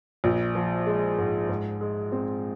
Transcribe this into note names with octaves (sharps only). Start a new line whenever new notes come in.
A#1
F3
G#3
G#2
G#2
G#3
C4